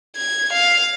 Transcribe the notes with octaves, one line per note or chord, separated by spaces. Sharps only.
G#6
F5